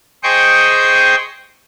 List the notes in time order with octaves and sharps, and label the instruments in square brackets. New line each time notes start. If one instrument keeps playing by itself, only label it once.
[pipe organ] G#4 C5 D#5 G5 C#6 G6